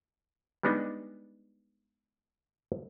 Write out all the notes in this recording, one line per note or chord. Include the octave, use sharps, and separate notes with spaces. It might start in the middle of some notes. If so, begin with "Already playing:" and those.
G3 G#3 B3 D4 D#4 G#4